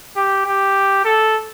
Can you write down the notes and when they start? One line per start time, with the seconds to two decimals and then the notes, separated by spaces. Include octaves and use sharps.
0.16 G4
0.46 G4
1.05 A4